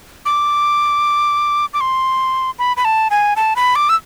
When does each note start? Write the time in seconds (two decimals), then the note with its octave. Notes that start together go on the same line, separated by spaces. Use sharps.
0.26 D6
1.74 D6
1.81 C6
2.59 B5
2.77 B5
2.85 A5
3.11 G#5
3.36 A5
3.56 B5
3.76 D6
3.89 E6